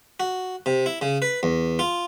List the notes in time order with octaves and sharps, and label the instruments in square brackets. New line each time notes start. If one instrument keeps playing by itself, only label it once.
[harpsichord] F#4
C3
E4
C#3
B4
E2
F4